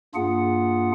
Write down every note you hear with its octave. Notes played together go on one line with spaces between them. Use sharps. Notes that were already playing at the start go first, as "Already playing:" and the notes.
G2 A#3 D4 F4 G#4 F#5